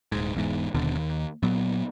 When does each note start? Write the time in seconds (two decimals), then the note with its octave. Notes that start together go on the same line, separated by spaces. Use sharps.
0.12 D#1 G#2
0.35 E1 E2 G#2
0.75 D#1 D#2 B2 D3
0.95 D#2
1.43 A#2 F#3 B3